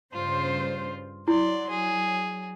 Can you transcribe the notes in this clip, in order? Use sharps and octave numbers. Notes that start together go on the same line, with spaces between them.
G2 C#3 F4 C5
F#3 E4 D5 C6
G#4